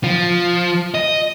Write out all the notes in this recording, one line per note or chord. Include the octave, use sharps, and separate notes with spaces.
F3
D#5